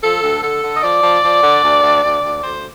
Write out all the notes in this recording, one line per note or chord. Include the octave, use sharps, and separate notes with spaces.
F3 A4
D2
D3 A4
D3
D#5
F3 D5
F3
F3
D3
D2
D2
D2
D2
D2 C5